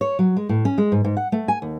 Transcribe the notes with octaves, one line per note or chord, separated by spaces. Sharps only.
C#5
F#3
G#3
A2
C#4
G#3
G#2
G#2
F#5
A3
G#5
D#2